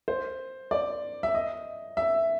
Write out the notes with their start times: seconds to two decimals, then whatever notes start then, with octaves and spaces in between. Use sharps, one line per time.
0.08 C5
0.71 D5
1.23 E5
1.35 D#5
1.97 E5